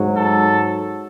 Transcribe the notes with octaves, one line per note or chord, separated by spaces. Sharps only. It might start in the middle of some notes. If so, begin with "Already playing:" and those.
Already playing: G#2 F#3
A4